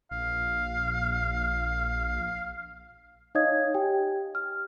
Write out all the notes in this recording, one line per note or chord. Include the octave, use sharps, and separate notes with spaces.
A#1 F5
D#4 C#5 D#5 F5 D#6 G#6
G4 G5 G#5
F6